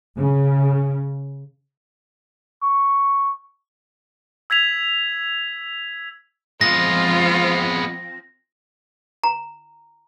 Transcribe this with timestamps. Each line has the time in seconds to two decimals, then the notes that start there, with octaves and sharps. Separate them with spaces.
0.17 C#3
2.63 C#6
4.50 E6 G#6 B6 F7
6.61 F3 G#3 B3 C4 F4 A#6
9.24 A#5